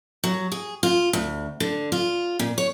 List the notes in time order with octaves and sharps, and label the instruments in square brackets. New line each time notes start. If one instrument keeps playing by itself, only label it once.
[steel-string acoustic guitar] F#3
G#4
F4
D2
D3
F4
A#2
C#5